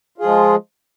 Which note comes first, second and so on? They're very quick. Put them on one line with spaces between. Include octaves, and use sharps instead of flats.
F4 G#4 F3 G#3